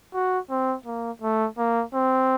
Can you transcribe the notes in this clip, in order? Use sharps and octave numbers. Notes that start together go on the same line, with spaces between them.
F#4
C4
A#3
A3
A#3
C4